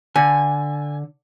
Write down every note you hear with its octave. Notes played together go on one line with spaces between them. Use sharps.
D3 G#5